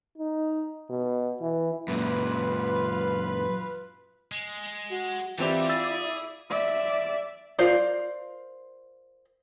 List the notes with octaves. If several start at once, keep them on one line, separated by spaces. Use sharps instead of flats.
D#4
B2
E3
F#2 A#2 F4 B4
G#3
F#4
E3 G3 C4 E4 F4 G4 D5 E5
G#4 E6 A6
D5 E5
F4 A#4 C5 D5